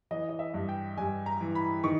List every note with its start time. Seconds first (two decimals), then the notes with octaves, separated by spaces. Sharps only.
0.11 E3 D#5
0.29 D#5
0.39 E5
0.54 G2
0.69 G5
0.97 G2 G#5
1.26 A#5
1.41 E3
1.55 B5
1.84 D#3 C#6